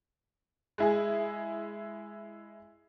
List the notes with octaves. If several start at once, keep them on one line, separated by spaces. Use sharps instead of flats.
G#3 E4 G#4